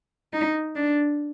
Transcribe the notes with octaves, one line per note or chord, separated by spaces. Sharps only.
D#4
D4